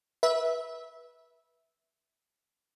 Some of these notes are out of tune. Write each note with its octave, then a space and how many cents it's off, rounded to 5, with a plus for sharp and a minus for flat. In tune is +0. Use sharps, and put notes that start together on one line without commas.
B4 -20 E5 -10